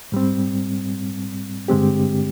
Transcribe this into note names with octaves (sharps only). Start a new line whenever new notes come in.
G#2 G3 C4
G2 D3 G#3 C4 G4